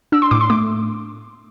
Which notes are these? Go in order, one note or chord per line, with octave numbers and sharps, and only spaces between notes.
D4 E6
C6
A2 D6
C6
A3 D6